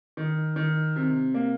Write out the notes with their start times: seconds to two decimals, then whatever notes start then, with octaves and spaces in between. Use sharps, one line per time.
0.17 D#3
0.56 D#3
0.96 C3
1.34 A#3